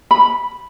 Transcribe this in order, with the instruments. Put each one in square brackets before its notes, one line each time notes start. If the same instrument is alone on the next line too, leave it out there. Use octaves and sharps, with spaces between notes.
[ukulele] B5